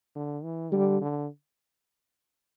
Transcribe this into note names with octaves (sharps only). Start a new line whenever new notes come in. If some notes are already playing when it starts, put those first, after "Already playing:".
D3
E3
D3 G3
D3